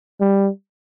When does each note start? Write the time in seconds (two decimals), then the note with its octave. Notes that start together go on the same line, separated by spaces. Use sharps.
0.21 G3